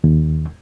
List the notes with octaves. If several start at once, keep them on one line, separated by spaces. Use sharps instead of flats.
D#2